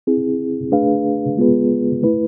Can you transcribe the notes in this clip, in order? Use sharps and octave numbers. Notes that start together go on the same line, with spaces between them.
C4 E4 G#4
A3 D4 G#4 B4 F5
G#3 B3 F4 G#4 B4
A3 E4 B4